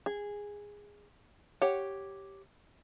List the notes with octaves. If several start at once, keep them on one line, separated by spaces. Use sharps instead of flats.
G#4
G4 C#5 F#5